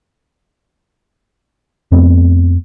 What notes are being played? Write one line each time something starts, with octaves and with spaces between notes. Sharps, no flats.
F2 A3 B3 C4